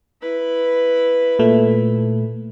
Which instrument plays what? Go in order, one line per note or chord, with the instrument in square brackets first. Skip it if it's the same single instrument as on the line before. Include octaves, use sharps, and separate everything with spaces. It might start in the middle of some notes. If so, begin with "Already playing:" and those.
[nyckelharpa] E4 B4
[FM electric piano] A#2 A3